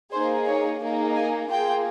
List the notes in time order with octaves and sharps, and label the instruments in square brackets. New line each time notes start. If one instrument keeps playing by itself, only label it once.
[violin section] A#3 D#4 G#4 C5
C#5
A#3 D#4 G#4
G#5
A#3 F4 G#4 G5